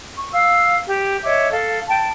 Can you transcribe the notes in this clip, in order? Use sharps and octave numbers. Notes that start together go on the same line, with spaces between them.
C#6
F5 E6
G4
C#5 D#5 E5 D6
A4 F5
G5 A5